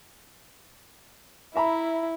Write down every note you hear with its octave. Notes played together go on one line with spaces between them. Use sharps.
E4 E5 A#5 B5